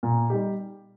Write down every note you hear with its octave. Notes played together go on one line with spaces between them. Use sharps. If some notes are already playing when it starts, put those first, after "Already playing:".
A#2
G3 D#4 G4